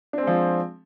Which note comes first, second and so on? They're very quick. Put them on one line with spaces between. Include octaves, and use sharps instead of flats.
D4 C4 G#3 F3